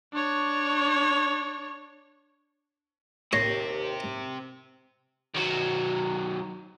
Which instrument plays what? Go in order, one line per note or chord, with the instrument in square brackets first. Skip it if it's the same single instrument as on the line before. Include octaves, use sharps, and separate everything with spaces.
[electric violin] D4 C#5
[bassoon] D#2 [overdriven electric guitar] C4 G4 [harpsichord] C#5 [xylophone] A#6 C7
[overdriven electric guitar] D#3 F#3